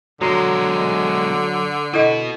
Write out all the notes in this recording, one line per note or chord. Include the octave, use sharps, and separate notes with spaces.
B2 D3 F#3 G#3 A#5 C6
B3 E4 F#4 A4 D#5